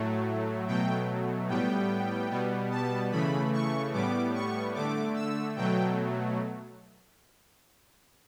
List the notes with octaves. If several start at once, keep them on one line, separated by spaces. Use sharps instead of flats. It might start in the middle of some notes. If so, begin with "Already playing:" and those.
Already playing: A2 F#3 A3
B2 F#3 A3 G5
A2 G3 B3 G5
B2 G3 B3
A5
C#3 E3 A3 B5
C#6
A2 G3 B3 D6
C#6
D3 A3 D6
E6
B2 F#3 A3 G5